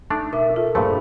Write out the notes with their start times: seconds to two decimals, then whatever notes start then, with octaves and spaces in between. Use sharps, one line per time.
0.10 A3 D4 D#4 D5
0.33 B2 A#4 E5 D6
0.56 F4 A4
0.75 G2 A#2 A3 G#4 C5 B5